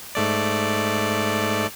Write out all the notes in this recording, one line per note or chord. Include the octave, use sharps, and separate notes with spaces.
G#2 A3 D5